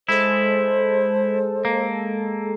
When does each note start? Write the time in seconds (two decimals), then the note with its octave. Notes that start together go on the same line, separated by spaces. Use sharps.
0.09 G#3 E4 A4 C5
1.65 A#3